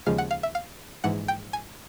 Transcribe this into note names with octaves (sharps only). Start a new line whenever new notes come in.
D#2 C#3 F3 G#3 F5
F#5
F5
E5
F5
A#1 G#2 E3 F#5
G5
G#5